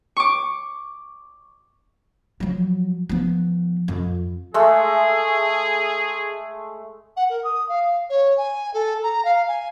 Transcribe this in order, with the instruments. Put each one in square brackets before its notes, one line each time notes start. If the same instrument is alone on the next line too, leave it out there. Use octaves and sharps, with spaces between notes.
[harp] C#6 D6
[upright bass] F3 F#3
F3 B3
F2
[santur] G#3 A3 [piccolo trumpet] G#4
[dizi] F#5
A#4
D#6
F5
C#5
G#5
A4
A#5
F5
G#5